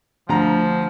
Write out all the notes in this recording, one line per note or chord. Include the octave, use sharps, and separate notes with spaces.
D2 F3 A#5